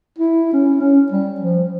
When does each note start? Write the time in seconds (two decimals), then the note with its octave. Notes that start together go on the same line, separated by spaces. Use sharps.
0.19 E4
0.53 C#4
0.81 C#4
1.12 G3
1.41 F3